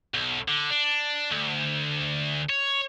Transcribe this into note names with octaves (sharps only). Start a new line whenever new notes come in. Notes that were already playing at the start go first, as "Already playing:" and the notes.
B1
D3
D4
D2
C#5